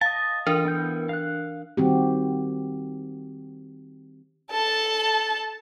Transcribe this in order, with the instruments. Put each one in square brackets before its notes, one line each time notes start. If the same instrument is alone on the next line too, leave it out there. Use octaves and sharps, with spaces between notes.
[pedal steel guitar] D#5 A5 [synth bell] F5
[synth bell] E3 D4 A#4 [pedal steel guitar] F4 D#5
[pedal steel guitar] B3 E4 G6
F5 F#6
[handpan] D#3 G3 C4 F#4 G4
[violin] A4 A5